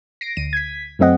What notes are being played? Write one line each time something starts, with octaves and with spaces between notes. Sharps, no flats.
A#6 C7 D7
D2 D#7
G#6 B6
F#2 F#3 A3 C4 D#5 F#5